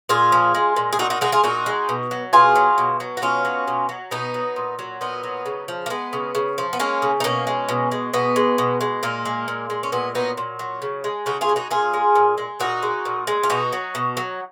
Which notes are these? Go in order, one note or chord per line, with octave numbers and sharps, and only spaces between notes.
A#2 F4 G#4
F3
G#3
A#2
G#4
A#2 D#4 F#4
D#4 F#4
G#3 D#4 F#4
F4 G#4
A#2 D#4 F#4
G#3
B2
F#3
B2 F4 G#4
F#3
B2
F#3
F#4
B2 C#4 F4
F#3
B2
F#3
B2 B3 D#4
F#3
A#2
F#3
A#2 B3 D#4
F#3
C#3
F3
A#3
G#3 B3
C#3
C#3
F3
B3
G#3 A#3 C#4
C#3
D#4
B2 A#3 C#4
G#3
B2
G#3
B2 B3
G#3
B2
G#3
A#2 A#3
G#3
A#2
G#3
C#4
A#2 B3
F#3 B3 D#4
A#2
F#3
C#3
G#3
C#3 D#4 F#4
F4 G#4
G#3
D#4 F#4
A#2 F4 G#4
G#3
A#2
G#3
A#2 D#4 F#4
G#3
A#2
G#3
F4
B2 D#4 F#4
F#3
B2
F#3